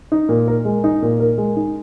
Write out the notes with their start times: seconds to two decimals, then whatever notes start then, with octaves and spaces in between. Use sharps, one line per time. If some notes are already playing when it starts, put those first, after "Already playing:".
0.12 D#4
0.29 A#2
0.48 A#4
0.65 G#3
0.84 D#4
1.02 A#2
1.20 A#4
1.38 G#3
1.56 D#4